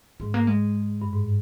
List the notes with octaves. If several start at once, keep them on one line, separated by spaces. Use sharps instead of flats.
G#2 G#3
A#3
G#3
G2
G#2